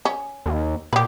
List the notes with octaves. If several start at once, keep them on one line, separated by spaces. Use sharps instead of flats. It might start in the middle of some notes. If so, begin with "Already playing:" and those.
C#4
D#2
A#2 G4 B4